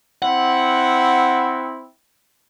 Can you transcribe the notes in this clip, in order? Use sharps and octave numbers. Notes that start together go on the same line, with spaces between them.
C4 E4 F#5